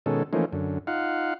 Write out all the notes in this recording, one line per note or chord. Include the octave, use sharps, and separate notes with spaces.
B2 D#3 G#3 C#4 A4
E3 F3 A3 A#3 C#4 D#4
F#2 D3
D#4 F4 F5 F#5